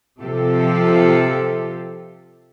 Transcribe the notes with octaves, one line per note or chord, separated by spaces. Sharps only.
C3 F3 G4 A4